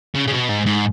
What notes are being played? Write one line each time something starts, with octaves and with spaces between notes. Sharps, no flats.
C#3
C#3
B2
G#2
G#2